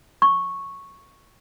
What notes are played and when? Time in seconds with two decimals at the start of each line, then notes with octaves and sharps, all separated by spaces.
0.22 C#6